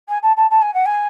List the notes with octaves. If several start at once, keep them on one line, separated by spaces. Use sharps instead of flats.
G#5
A5
A5
A5
G#5
F#5
G#5